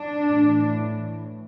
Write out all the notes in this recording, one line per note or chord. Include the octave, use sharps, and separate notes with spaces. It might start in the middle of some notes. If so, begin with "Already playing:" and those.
Already playing: D4
A2 E3